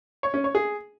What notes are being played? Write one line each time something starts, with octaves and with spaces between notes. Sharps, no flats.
C#5
C#4
C#5
G#4